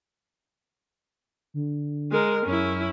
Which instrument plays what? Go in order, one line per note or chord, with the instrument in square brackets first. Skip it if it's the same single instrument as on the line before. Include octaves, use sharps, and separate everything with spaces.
[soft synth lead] D3
[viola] G#3 A#4
[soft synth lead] F#2 [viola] C#4 E4